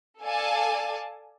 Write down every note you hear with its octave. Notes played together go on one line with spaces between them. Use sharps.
A4 D5 F5 G#5 A5